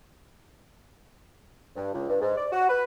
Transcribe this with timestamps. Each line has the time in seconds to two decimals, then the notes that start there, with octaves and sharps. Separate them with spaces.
1.76 G2
1.93 C#2
2.09 G2
2.21 G#2
2.37 D5
2.52 F#4
2.69 B4